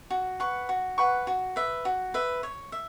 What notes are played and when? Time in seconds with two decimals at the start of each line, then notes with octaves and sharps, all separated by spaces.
0.10 F#4
0.40 B4 F#5 C#6
0.69 F#4
0.98 B4 F#5 C#6
1.27 F#4
1.56 B4 E5
1.85 F#4
2.14 B4 E5
2.43 C#5
2.72 E5